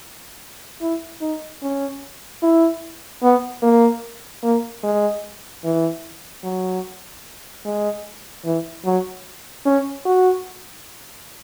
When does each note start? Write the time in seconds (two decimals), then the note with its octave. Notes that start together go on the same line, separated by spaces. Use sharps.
0.81 E4
1.21 D#4
1.62 C#4
2.43 E4
3.23 B3
3.62 A#3
4.44 A#3
4.83 G#3
5.64 E3
6.43 F#3
7.65 G#3
8.45 E3
8.86 F#3
9.66 C#4
10.05 F#4